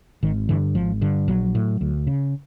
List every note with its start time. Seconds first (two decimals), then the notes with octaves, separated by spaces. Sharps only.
0.23 G#1 D#3
0.49 G2 D3 E3
0.75 G#1 F3
1.01 G2 D3
1.28 A#1 F#3
1.55 A2
1.81 D2
2.07 C#3